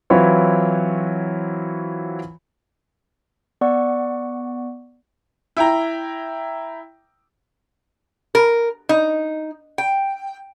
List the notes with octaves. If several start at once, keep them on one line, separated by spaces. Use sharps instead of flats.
E3 F#3 C4 E4 F4 C#5
B3 D5 F#5 C#6
E4 G5 A#5
A#4
D#4
G5